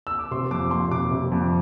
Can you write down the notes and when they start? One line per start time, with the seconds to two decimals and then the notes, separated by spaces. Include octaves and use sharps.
0.07 E6
0.19 D6
0.31 C3 C6
0.51 F2 D6
0.71 F2 C6
0.91 C3 D6
1.11 C3
1.32 F2